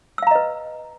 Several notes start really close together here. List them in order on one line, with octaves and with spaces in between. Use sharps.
E6 F5 A#5 D#5 B4